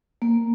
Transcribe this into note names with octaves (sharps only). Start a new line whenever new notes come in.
A#3